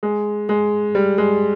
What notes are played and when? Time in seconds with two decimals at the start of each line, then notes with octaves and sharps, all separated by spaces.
0.03 G#3
0.49 G#3
0.95 G3
1.18 G#3